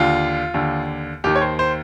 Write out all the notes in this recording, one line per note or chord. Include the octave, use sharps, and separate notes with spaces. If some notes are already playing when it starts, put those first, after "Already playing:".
Already playing: D#2 D3 F4
D#2 D3
D#2 D#3 G4
C#5
C5
C5